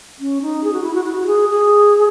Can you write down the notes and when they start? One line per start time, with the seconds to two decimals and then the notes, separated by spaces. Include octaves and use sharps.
0.20 C#4
0.42 D#4
0.64 G#4
0.73 F#4
0.83 E4
0.94 F#4
1.05 F#4
1.20 F#4
1.26 G#4
1.49 G#4